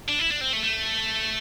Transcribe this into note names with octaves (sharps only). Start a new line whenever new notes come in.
D4
E4
D4
C4
A3
A3